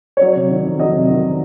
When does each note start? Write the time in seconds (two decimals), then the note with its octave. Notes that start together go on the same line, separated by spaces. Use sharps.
0.17 C#5
0.21 F#3 D5
0.36 C3
0.50 D#3
0.65 F2
0.79 F#3 D#5
0.95 C3
1.09 D#3